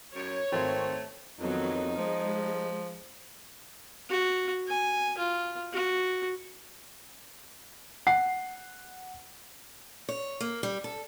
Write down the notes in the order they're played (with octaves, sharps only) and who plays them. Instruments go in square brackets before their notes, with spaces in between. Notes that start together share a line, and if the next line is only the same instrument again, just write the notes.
[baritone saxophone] F#2 [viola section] C#5
[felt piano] G#1 D#3 C6 [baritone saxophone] A3 [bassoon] C4
[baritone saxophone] F2 [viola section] D#3 F#3 B3 [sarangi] D#4
[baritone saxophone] F3 [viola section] G#3
[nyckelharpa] F#4
G#5
F4
F#4
[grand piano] F#5 C7
[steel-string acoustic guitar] C#5
A#3
G3
A4